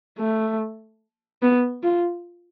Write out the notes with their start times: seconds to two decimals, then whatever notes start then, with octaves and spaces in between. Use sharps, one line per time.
0.18 A3
1.42 B3
1.83 F4